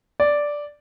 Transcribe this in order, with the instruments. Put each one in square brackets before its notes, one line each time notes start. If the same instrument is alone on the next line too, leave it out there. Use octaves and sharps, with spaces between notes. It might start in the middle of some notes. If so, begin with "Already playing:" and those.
[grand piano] D5